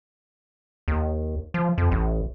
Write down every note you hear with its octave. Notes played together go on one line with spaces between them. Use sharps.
D#2
F3
F2
A1